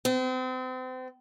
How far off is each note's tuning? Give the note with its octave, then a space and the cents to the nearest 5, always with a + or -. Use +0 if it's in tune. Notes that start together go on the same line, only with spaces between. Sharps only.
C4 -35